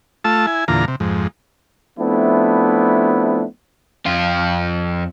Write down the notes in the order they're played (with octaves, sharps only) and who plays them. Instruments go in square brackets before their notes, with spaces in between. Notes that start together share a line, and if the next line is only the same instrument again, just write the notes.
[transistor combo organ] A3 F4 A5 E6
E4 G#5
E2 A#2 D3 F4 A#5
C3
F2 G#2
[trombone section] F3 A3 B3 C4 D4 E4
[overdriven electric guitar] F2 F4